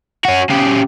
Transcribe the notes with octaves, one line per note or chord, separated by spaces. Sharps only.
C#4 F#4
C#3 G4